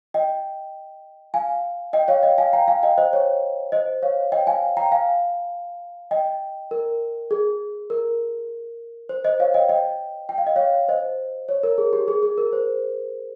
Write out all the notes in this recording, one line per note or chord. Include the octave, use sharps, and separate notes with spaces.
D#5 G5
F5 G#5
D#5 G5
C#5 F5
D#5 G5
F5 G#5
G5 A#5
F5 G#5
D#5 G5
C5 D#5
C#5
C5 D#5
C#5 F5
D#5 G5
F5 G#5
G5 A#5
F5 G#5
D#5 G5
A#4
G#4
A#4
C5
C5 D#5
C#5 F5
D#5 G5
D#5 G5
G5
F5
D#5
C#5 F5
C5 D#5
C#5
A#4
G#4
G4
G#4
G#4
A#4
C5